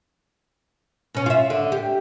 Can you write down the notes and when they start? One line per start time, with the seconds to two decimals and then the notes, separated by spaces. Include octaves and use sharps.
1.15 B2 C#4
1.26 F4 E5
1.50 D3
1.72 G4